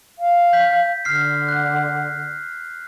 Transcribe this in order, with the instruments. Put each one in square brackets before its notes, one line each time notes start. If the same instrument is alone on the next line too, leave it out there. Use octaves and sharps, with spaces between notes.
[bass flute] F5
[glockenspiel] G6 B6
[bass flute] D3 [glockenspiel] F6 C7
[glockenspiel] F#6